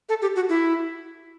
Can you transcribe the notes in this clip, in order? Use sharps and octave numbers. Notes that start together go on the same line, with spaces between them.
A4
G4
F#4
E4